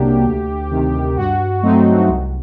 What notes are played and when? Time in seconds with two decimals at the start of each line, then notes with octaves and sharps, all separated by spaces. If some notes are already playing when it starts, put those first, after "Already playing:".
Already playing: C2 C3 F#3 A#3 D4 G4
0.24 D2
0.70 C3 D#3
1.16 G2 F#4
1.62 F#3 A3 C4 D#4
2.08 C2